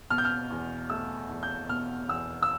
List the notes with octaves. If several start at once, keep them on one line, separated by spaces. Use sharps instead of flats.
B2 F6
G6
F6
E2
A3 E6
E2
G6
B2 F6
E2 E6
E6